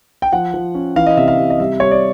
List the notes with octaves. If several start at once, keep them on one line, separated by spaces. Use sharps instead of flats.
G5
F3 F#5
F3
C#4
E3 F5
D#5
C3 E5
F5
C3
D#5
G3 E5
G3 C#5
D5